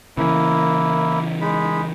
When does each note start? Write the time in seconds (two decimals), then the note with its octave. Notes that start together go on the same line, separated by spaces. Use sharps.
0.17 C#3 E3 A#3 E4
1.41 G#3 D#4 B5